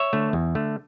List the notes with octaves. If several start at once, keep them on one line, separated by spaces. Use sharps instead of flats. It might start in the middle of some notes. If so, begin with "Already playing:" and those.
Already playing: C#5 E5
D3 A3
E2
D3 A3